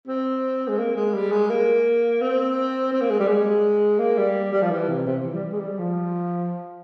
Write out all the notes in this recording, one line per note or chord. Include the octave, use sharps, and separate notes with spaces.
C4
G#3
A#3
G#3
G3
G#3
A#3
C4
C4
A#3
G#3
G3
G#3
A#3
G3
G3
F3
E3
C3
C3
E3
G3
G#3
G3
F3